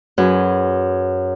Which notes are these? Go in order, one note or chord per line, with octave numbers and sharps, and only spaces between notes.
F#2 G#4 B4